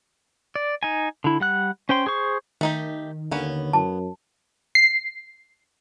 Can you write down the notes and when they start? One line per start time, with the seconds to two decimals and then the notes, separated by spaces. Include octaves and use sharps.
0.56 D5
0.83 D#4 G#5
1.24 D3 E4
1.40 G3 F#5 F#6
1.89 C#4 C5 G5 C6
2.06 G#4 C5 C#6
2.61 D#3 A3 D#4 G4
3.31 D#2 D3 A#3 B3 C#4
3.73 F#2 A5
4.75 C7